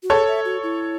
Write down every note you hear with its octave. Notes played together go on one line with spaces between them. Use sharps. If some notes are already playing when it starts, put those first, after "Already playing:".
F#4
G#4 A4 C#5
E5
F#4
E4